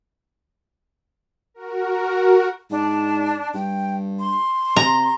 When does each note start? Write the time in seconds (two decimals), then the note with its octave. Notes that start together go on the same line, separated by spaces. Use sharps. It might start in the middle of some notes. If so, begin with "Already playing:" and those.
1.54 F#4 A#4
2.71 G#2 D4
3.54 G2 G5
4.20 C6
4.76 C3 A#5